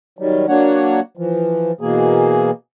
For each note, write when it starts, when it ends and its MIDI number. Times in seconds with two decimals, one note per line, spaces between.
0.19 0.46 51
0.19 0.46 54
0.19 0.46 55
0.48 1.00 54
0.48 1.00 58
0.48 1.00 62
0.48 1.00 73
0.48 1.00 78
1.17 1.72 52
1.17 1.72 53
1.81 2.51 47
1.81 2.51 52
1.81 2.51 58
1.81 2.51 68